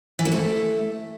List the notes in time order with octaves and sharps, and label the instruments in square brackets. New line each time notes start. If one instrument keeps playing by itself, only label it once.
[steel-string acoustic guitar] E3
A#3
A3